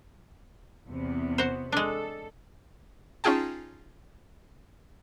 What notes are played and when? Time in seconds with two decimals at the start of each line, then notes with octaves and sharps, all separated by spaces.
0.87 E2 C3 B3
1.38 F#4 C5
1.72 G#3 D4 A4
3.24 C#4 D#4 F4 G#4 G5 A5